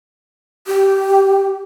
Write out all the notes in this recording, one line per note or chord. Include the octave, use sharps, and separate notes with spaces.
G4